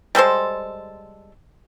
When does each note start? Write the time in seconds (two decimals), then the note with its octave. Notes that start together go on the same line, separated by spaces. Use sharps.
0.15 G3 G#3 A4 C5